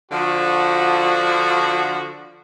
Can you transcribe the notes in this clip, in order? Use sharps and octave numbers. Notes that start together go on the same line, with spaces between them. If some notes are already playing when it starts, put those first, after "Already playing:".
D3 F3 F#4